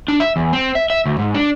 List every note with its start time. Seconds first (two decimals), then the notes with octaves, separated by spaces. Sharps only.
0.08 D4
0.20 E5
0.36 E2
0.53 C4
0.75 E5
0.90 E5
1.06 D2
1.19 G#2
1.35 D4